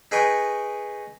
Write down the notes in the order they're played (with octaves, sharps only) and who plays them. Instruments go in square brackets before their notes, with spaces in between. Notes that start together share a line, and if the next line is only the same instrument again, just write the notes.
[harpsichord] D#4 G#4 B4 D#5 G5 C#6